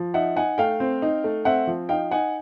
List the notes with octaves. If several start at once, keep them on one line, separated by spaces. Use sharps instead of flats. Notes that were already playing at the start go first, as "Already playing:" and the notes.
Already playing: F3
D#4 E5 F#5
D#4 F#5 G#5
A3 F5 G5
C4
D#4
A3
C4 E5 F#5
F3
D#4 F5 G5
D#4 F#5 G#5